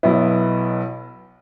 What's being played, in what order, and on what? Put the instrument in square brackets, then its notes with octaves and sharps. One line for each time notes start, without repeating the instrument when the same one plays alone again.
[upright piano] B1 B2 B3 E4